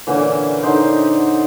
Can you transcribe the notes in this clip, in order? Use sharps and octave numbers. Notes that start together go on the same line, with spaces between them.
A#2 D3 E3 C#4
D3 D#4 C5